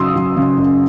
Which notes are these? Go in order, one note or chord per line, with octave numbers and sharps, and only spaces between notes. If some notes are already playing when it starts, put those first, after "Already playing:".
Already playing: F#2 C#3 F#3 C6 D#6 E6
F#3
C#3
F#2